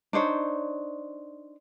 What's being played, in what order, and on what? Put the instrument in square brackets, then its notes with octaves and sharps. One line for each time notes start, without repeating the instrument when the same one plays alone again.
[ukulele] D4 D#4 C5 C#5